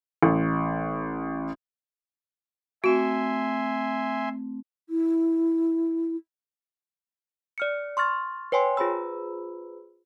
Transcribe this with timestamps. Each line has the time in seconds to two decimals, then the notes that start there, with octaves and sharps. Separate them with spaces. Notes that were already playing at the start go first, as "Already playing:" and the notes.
0.23 A1
2.84 A3 C4 F#4 E5 G#5 C6
4.89 E4
7.58 D5 F6 C#7
7.97 C6 C#6 F6 A6
8.52 B4 C#5 G5 G#5 C6
8.77 F4 G#4 B4 C5 B5 E6